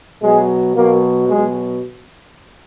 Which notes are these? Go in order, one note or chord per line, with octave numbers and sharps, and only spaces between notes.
B2 F#3 G#3
B2 F#3 A#3
B2 F#3 G#3